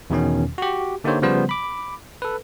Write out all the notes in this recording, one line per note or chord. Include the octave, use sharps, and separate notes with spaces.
E2 B2 D#3 C#4
F#4 G4
D3 A#3 D#4 G4 C5 C#5
C#3 F3 G3 B3 C5
B5 D6
A4 B4